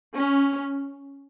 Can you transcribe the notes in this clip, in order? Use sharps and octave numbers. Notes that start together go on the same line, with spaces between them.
C#4